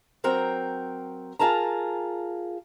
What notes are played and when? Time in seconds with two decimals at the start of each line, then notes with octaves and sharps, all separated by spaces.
0.24 F#3 C4 A#4 F#5 G5
1.39 F4 G#4 A#4 A5 A#5